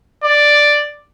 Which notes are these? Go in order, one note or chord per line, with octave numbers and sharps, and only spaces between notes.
D5